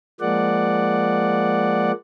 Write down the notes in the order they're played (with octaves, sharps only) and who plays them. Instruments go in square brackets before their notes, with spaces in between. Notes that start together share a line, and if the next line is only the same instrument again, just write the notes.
[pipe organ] F3 G#3 A#3 D5 F#5